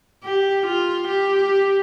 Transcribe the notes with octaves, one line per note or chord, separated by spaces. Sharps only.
G4
F4
G4